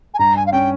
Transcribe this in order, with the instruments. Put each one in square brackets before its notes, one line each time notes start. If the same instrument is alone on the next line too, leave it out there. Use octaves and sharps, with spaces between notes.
[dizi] G#5
[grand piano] G2 [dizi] A#5
[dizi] G#5
F5
[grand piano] C#4 [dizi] G5